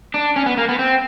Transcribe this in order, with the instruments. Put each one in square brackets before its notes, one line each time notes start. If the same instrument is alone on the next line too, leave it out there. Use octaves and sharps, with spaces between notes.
[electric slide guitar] D4
C#4
B3
A#3
B3
C4